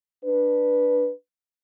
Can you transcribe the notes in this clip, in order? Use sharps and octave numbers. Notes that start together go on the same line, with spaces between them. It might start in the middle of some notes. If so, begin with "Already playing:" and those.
D4 B4